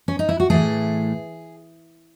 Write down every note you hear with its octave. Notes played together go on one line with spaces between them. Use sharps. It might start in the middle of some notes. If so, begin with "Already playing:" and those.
C#4
D#4
E4
F#4
A2 E3 A3 G#4